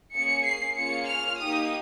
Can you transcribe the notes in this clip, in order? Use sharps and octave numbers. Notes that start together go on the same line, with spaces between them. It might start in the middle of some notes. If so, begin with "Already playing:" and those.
A#3 C#4 G#4 C#7
C7
A#3 C#4 F4 G#4 C#7
F6
A#3 D#4 G4 D#6